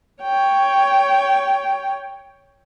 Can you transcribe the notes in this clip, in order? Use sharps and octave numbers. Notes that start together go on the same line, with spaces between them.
C#5 G5